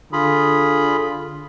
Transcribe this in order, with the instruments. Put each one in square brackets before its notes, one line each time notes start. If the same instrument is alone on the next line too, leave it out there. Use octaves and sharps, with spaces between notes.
[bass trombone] D3 [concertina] F4 G#4 B5